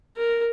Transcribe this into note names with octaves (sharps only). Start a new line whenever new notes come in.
A#4